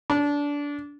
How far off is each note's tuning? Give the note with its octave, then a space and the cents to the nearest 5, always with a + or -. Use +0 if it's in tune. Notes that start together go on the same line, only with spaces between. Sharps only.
D4 -20